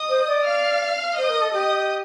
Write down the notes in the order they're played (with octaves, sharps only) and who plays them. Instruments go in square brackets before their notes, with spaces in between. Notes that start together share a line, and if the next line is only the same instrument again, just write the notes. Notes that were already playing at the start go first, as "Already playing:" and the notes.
Already playing: [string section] D#5 D#6
[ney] C5
D5
[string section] F5 F6
[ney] C5 [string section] D#5 D#6
[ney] A#4
A4
[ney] G4 [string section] D#5 D#6